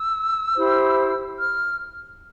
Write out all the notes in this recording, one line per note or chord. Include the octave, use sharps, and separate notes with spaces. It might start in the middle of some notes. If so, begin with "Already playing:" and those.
Already playing: E6
E4 G4 C5
F6